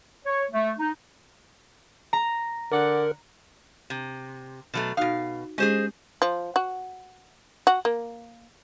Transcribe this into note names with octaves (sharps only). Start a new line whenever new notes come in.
C#5
A3
D#4
A#5
D3 A#4 D5 F#5
C3
B2 F#3 A3
B2 D#4 F#4 F5
G#3 C#4 G4 G#4 C5 D#5
F3
F#4
F#4
A#3